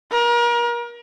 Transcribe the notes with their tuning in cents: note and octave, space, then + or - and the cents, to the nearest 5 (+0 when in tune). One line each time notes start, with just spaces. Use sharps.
A#4 +35